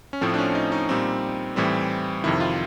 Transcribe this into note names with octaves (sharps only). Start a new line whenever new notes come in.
C#4
A2 F3 A3 C4
D4
C#4
D#4
D#4
A#2 G3 C4
A2 E3 G3 C4
F2 C3 D#3 E4
F4